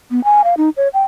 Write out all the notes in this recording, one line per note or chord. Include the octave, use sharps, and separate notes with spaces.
B3
G#5
F5
D#4
C#5
G5